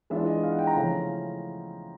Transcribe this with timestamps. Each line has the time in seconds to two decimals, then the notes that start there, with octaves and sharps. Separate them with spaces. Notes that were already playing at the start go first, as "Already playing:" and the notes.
0.10 E3 G#3 B3 D4 F4 E5
0.27 D#5
0.43 F5
0.52 F#5
0.59 G5
0.67 A#5
0.76 C#3 F3 A3 C#4 E4